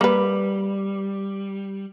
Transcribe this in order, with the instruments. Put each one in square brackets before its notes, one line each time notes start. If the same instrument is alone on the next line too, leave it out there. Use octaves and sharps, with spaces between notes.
[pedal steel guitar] G3 [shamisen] A#3 B4